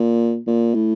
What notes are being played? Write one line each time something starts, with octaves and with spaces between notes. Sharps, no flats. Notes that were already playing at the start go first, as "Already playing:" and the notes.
Already playing: A#2
A#2
A2